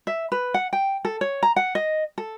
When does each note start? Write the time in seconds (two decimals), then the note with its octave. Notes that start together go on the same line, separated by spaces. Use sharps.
0.07 E5
0.32 B4
0.54 F#5
0.73 G5
1.05 A4
1.21 C#5
1.43 A#5
1.56 F#5
1.75 D#5
2.18 A4